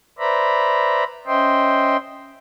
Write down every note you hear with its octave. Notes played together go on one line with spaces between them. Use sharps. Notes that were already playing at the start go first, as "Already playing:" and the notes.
B4 C5 D5 E5 A#5 B5
C#4 C5 D#5 E5 G5 C6